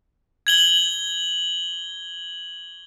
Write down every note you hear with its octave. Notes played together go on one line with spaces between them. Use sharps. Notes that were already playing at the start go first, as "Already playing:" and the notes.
G#6 F#7 G7